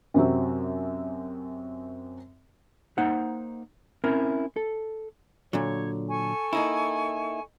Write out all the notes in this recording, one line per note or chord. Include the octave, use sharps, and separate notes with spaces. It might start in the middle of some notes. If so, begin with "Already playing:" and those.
F#2 C3 F#3 C4
A#3 D#4 C5 F#5
C4 C#4 E4 A#4
A4
A#2 D3 F#3 C#5
A4 G#5 C#6
A#3 D#4 E4